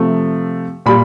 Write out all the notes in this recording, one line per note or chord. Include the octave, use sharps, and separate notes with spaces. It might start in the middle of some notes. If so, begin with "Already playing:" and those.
Already playing: C3 F3 A3
A#2 G3 B5